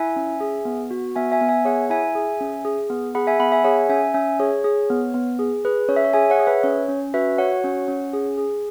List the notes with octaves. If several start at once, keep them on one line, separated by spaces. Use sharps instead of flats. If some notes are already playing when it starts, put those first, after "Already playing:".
Already playing: E4 E5 G#5
C#4
G#4
B3
F#4
B3 E5 G#5
E5 G#5
B3
E5 G#5
G#4 C#5 F#5
E4 E5 G#5
G#4
C#4
G#4
B3
G#4 F#5 B5
E5 G#5
B3 F#5 B5
E5 G#5
G#4 C#5 F#5
C#4 E5 G#5
C#4 E5 G#5
G#4 C#5
G#4
B3
B3
G#4
G#4 B4
C#4 C#5
E5
C#5
G#4 E5 G#5
C#5 F#5
G#4
B4 E5
C#4 C#5
C#4
F#4 B4 E5
F#4 C#5 F#5
C#4
C#4
G#4
G#4